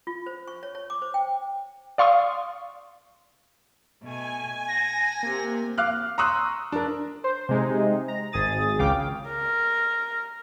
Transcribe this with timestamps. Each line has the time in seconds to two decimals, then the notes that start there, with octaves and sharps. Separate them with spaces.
0.07 F4
0.26 C5
0.48 C#6
0.63 C#5
0.75 C#5
0.90 D6
1.02 C5
1.14 G5
1.98 D5 F5 C6 C#6 D#6
4.04 B2 A3 G#5
4.68 F#5 A5 A#6
5.23 C3 A#3
5.78 F5 D6 F6 F#6
6.18 A#5 C6 C#6 D#6 E6 F#6
6.72 D4 A#4
7.24 C5
7.49 C3 G#3 D#4
8.08 A#5
8.32 G#1 G#4 D#6 A6
8.79 C#2 C#3 F5 G5 D6
9.28 A#4